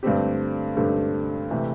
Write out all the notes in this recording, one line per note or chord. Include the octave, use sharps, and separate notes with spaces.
G2 D3 A3 C4 G4
G2 D3 A3 C4 G4
C3 E3 A3